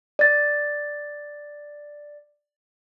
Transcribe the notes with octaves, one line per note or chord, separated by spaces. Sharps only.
D5 A6